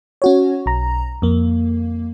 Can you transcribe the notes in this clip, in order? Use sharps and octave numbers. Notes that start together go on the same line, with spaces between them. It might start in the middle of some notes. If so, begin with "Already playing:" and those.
C#4 F#4 C#5
B1 A#5
F2 A#3